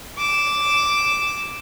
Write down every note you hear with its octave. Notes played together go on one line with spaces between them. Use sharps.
D6 E7